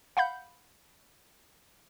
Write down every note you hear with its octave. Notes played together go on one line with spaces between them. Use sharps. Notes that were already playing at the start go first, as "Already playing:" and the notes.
F5 F#5 B5 G6